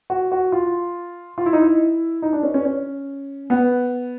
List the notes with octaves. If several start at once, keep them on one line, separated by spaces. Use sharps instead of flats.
F#4
F#4
F4
F4
E4
D#4
E4
D#4
D4
C#4
C#4
C#4
B3